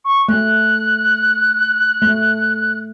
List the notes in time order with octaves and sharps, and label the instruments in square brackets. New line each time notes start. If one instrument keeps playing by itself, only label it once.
[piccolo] C#6
[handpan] A3 [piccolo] F#6
[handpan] A3